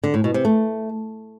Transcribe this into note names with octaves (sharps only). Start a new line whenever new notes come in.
D3
A2
B2
C3
A3